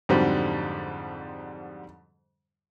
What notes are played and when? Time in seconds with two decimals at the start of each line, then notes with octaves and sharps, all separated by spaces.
0.09 F2 G#2 D3 F#3 G3 C4